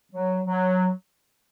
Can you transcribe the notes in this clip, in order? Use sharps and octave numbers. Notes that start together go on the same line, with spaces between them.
F#3
F#3